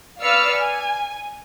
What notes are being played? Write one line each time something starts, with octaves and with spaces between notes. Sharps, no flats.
B4 D5 F5 E6 F6 C#7
G#5